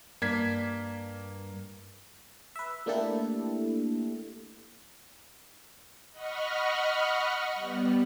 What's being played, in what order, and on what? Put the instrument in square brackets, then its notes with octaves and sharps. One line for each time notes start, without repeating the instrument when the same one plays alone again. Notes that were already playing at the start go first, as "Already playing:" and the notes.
[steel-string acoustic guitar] G2 [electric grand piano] A#3 G#6 B6
[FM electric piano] B4 E5
A3 A#3 D4 E4 G4 A4
[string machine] D#5 F#5 B5 C#6 F6
G3 B3